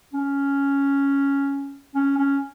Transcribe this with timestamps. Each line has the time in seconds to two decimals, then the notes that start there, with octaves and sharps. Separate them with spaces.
0.13 C#4
1.95 C#4
2.17 C#4